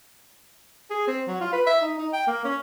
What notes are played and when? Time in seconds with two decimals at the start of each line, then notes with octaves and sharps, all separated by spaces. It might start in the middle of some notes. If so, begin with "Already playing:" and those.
0.90 G#4
1.07 C4
1.27 F#3
1.41 F4
1.53 B4
1.66 E5
1.82 D#4
1.98 D#4
2.13 G5
2.27 A#3
2.44 C#4